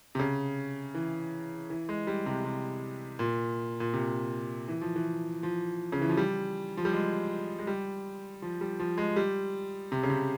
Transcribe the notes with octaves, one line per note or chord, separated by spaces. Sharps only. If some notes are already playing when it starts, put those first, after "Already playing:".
C3
C#3
E3
E3
G#3
G3
C3
C3
A#2
A#2
C3
E3
F3
E3
F3
C#3
E3
F3
G3
F3
G3
G#3
G#3
G3
F3
G3
F3
G#3
G3
C3
C#3
C3